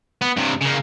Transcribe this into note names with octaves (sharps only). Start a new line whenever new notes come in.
B3
G2 C3
C#3 A#3